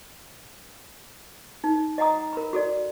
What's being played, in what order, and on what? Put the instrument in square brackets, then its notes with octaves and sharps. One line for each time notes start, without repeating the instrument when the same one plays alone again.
[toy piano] D#4
D#5 F#5 A#5 D#6
A#4 B5
F#4 A4 D5